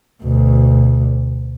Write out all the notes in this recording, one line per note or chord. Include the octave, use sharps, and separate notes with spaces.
D2 B2